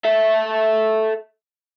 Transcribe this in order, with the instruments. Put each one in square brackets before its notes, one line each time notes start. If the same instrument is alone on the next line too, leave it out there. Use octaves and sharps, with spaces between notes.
[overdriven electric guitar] A4 E5